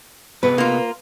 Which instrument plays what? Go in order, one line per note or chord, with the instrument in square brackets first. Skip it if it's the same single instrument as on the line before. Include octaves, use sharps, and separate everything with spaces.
[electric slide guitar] C3 B3 G#4 [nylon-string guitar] B4
[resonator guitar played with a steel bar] A#3 F4